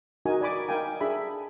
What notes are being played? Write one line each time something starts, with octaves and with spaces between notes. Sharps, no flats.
D#4 F#4 A#4 G#5
D5 G#5 B5 D6
D#4 A#4 F5 G5 G#5
D4 G#4 E5 B5